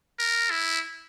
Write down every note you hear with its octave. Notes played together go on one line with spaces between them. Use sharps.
A#4
E4